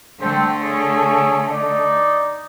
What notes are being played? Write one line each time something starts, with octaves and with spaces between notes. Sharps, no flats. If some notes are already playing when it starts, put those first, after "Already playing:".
D3 A3 C4
G#4 C#5 E5
D#4 D5